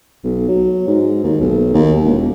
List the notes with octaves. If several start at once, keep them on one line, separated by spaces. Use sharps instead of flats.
B1
F#3
G#2
D#2
B1
D#2
E1